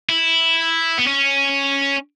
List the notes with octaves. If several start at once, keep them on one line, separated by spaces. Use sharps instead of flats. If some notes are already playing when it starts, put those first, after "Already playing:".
E4
B3
C#4